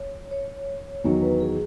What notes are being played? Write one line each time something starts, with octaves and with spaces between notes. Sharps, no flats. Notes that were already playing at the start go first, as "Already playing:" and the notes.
Already playing: C#5
C#5
E2 D#3 F#3 C#5
B4
G#4